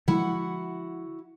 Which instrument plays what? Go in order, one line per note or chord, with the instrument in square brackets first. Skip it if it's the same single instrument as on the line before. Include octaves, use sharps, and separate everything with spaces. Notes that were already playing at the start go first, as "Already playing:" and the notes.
[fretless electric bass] D3 F3 G#3 [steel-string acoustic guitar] E4 F#4 F#5